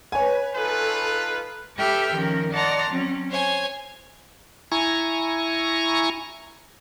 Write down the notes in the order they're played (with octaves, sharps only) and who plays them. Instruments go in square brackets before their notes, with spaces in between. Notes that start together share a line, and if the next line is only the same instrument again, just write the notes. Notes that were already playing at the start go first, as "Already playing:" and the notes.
[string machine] B4 [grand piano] C#5 G#5
[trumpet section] D#4 F4 B4 [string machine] A4
[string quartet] G4 A4 B4 E5 G5 F6
D#3 F3 C#4 A#4
D5 D#5 F#5 A5 A#5 C6
F#3 C4 C#4
C5 C#5 G#5
[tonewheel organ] E4 G#5 A#5 C#6